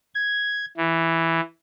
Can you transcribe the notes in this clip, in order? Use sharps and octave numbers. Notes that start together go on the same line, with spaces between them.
G#6
E3